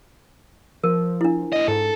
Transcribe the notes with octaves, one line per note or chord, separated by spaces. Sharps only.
F3 A#4
D4 E4
A#2 D#5
G#2 A4